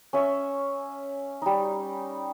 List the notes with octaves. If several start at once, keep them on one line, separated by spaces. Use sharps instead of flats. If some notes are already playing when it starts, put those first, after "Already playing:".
C#4 E5 C#6 E6
G3 D#4